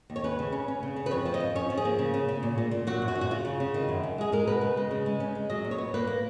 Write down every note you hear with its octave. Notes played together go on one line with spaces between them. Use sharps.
D#2
C#5
C#4 B4
C#3
C#4
C#4
C#3
C#3
B4
F2 C#5
F3
D#5
F2
C#4 C#5
F3
G#4
A#3
C#3
C#3
C#3
A#2
A#2
A#2
F#3 F#4
F#2
F#4
F#2
F#4
C#3 F4
C#3
C#3
D#3
F#2
F#2
G#3 G#4
G#3 A#4
B2 B4
C#3
G#3
C#3
G#3
C#4
G#3
F#3 D#5
A#2
C#5
B3
A#3 B4
A#3